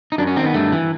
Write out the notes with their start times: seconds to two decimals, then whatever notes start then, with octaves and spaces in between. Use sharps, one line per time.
0.12 D#4
0.18 F#2 D4
0.27 C#4
0.36 D#3 C4
0.46 B3
0.54 G2 A3
0.72 E3